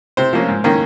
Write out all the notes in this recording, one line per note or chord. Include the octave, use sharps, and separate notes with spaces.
C3 C5
F3 A#3 C#4
G#2
D#3 A#3 C#4